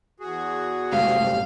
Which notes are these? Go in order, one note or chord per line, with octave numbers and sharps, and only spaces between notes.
E2 F#4 G#4
F#1 C#2 A2 C3 G3 F5